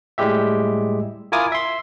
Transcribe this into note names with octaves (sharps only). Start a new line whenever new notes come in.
A2 G3 G#3 G4 E5
E4 F4 A#4 G#5 D6 D#6
E5 C6